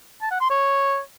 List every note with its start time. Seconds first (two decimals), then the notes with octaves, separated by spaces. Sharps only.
0.22 A5
0.31 F#5
0.41 C6
0.50 C#5